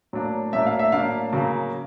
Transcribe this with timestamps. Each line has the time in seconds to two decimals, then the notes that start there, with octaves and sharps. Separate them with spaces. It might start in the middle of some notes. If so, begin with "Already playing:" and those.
0.13 A2 F#3 A#3 D4
0.53 A2 F#3 A#3 D4 E5
0.66 F5
0.79 E5
0.92 A2 F#3 A#3 D4 F5
1.33 C#3 F#3 A#3